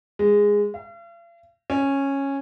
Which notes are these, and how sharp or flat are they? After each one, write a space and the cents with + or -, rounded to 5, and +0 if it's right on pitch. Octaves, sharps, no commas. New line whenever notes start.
G#3 -10
F5 -45
C#4 -10